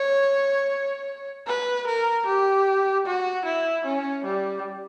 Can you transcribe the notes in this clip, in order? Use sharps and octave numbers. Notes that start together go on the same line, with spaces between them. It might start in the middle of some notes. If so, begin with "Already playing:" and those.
Already playing: C#5
B4
A#4
G4
F#4
E4
C#4
G3